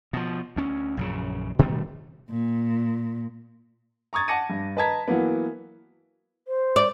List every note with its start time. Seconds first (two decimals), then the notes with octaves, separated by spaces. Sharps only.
0.13 B2 F3
0.56 D2 C#4
0.97 A#1 F#2 C#3
1.59 B2 D#3 G3 A3
2.30 A#2
4.13 A#5 C#6 D#6 G#6 A6
4.28 F#5 A5 D6 A#6 C#7 D#7
4.50 G2
4.77 B4 D#5 A5 A#5 G#6 B6
5.08 E3 F#3 A#3 B3
6.48 C5
6.76 D5